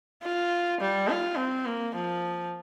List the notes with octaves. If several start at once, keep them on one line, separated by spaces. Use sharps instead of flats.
F4
G3
F4
C4
A#3
F3